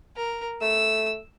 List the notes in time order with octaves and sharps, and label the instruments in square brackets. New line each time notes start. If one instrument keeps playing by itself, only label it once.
[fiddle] A#4
[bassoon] A3 [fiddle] E6